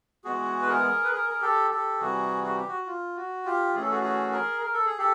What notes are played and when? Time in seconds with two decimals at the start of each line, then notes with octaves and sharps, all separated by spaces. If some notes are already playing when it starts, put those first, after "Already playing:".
0.25 E3 G#3 B3 F#4 G#4
0.62 B4
0.69 G#4 A#4
1.04 B4
1.12 G#4 A#4
1.30 A#4
1.42 G4 A4
1.71 G4 A4
2.00 C3 E3 G3 F#4 G#4
2.44 F#4
2.56 G4
2.68 F#4
2.87 F4
3.16 F#4
3.45 F4 G4
3.74 E3 A3 C#4 G#4
3.82 A4
3.90 F#4 G#4
4.03 F#4 G#4
4.32 G#4 A#4
4.62 A#4
4.74 A4
4.86 G#4
4.98 G4 A4